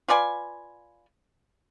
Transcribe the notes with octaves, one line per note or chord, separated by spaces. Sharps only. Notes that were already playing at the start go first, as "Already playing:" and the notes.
F4 B4 D5 G#5